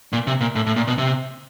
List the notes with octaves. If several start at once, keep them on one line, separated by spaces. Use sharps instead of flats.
A#2
C3
A#2
A2
A2
A#2
B2
C3